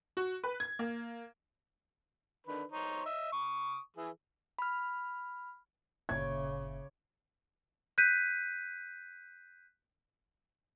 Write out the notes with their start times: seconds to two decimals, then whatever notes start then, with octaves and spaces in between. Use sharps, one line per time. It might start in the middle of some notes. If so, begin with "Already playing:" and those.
0.17 F#4
0.44 B4
0.60 G#6
0.79 A#3
2.47 D3 D#3 B4
2.72 D#4 C5 C#5
3.06 D#5 E5
3.32 C#6 D#6
3.97 E3 G#4
4.59 B5 F6
6.09 G1 A#2 C#3 C#5 D5 E5 G#6
7.98 F#6 G6 B6 D#7